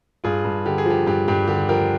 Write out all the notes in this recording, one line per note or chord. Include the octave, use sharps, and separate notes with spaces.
G2 F4 G#4
G2
D3 G4
G#4
F3 G4
G2 G4
G2 G4
D3 G4
F3 G4 A#4